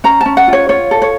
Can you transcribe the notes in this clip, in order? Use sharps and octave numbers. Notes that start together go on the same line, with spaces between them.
C#4 A#5
A5
C#4
F#5
F4
C#5
F4 C#5
A4
C#5